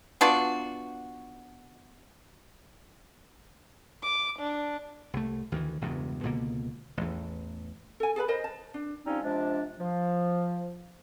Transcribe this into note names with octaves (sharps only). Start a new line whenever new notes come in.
B3 D4 F4 F#4
D6
D4
C2 A3
D2 D#3 E3
E1 E2 G2 C#3
C#2 B2 D3 A#3
A1 E2
A4 G#5
G#4 A4 B4 B5
A#4 C5 D#5
A5
D4
F3 G3 C4 C#4 D#4
C3 F3 G#3 D4
F3